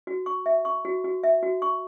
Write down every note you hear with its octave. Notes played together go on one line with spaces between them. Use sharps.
F#4
C#6
E5
C#6
F#4
F#4
E5
F#4
C#6